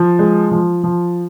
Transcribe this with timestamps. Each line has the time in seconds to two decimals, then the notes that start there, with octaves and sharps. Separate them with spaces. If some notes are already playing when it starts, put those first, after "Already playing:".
Already playing: F3
0.19 G#3
0.51 F3
0.83 F3